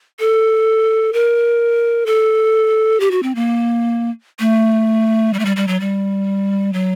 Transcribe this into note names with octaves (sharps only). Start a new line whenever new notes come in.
A4
A#4
A4
G4
F#4
C4
A#3
A3
G3
A3
G3
G3
F#3
G3
F#3